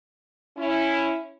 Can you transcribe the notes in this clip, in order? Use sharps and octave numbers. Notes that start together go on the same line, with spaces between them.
C#4 E4